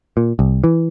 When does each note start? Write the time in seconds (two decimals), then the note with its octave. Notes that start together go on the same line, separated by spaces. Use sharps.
0.17 A#2
0.39 C2
0.64 E3